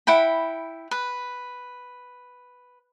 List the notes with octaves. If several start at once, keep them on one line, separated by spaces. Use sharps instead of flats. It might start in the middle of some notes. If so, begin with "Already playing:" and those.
E4 F#5 G5 B5
B4